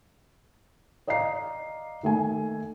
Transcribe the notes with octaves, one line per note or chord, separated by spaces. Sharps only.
D5 D#5 F5 A#5 C7
D#3 A3 G#5